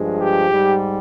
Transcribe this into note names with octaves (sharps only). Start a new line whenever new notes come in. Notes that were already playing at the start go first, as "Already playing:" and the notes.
Already playing: G2 F3 G#3
G4
G#2 G3